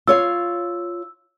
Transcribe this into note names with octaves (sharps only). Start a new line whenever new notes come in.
F4 C#5 F5 E6